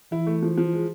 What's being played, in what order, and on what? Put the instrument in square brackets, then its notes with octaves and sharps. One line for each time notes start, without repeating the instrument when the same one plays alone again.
[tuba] E3 [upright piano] E4
[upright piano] A3
F3
F3
G#3